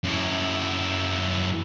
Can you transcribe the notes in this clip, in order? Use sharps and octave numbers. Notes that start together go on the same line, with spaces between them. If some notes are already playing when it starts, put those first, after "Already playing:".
F#2 E4